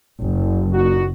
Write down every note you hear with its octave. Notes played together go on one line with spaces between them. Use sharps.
F#1
A#2 D#4 F#4